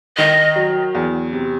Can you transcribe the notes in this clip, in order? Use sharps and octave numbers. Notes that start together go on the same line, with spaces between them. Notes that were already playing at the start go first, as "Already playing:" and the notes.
D#3 D#5
F#3
E2
C3